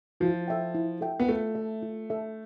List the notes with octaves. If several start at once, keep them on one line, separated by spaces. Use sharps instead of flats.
F3 E4
A4 E5 G5
E4
A4 E5 G5
B3
A3 F4
A4 E5
F4
A4 E5